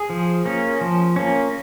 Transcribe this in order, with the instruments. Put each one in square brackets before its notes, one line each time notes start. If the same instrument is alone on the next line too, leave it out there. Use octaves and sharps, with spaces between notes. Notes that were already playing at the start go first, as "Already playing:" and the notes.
Already playing: [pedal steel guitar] G#4
F3
A#3 C#4
F3
A#3 C#4